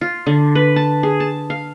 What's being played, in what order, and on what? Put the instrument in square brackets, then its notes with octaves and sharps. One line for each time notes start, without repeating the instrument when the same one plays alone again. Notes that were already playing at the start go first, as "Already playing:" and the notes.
[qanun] F4
D3
B4
A5
G#4
A5
F5